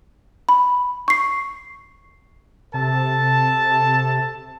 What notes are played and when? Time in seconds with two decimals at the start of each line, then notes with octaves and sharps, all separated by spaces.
0.49 B5
1.08 C#6 C7
2.74 C3 A4 A5